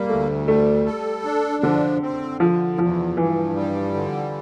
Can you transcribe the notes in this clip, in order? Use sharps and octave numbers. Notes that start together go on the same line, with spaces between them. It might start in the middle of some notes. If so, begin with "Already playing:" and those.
Already playing: G3 A#3
D2 A3
G3 A3
A4
D4
D3 F3
C4
D3 F3
E2 F3
G2 E3
G3
D3